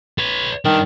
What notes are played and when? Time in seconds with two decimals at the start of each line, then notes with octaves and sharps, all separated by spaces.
0.18 B4 C#5
0.65 G2 D#3 D4